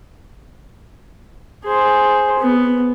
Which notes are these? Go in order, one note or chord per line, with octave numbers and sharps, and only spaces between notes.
G#4 C5
B3